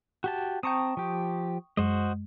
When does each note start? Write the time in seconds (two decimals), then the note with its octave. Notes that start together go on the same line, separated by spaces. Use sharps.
0.24 F#4 G4 A5
0.63 C4 G5 A5 A#5 C#6 D#6
0.97 F3 G4
1.77 F#2 G#3 F#4 C5 D#5